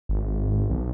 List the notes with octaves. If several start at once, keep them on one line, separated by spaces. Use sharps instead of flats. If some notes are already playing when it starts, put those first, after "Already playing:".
G#1
B1